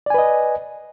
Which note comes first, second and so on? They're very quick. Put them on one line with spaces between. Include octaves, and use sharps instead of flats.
D5 G#5 B4 D#5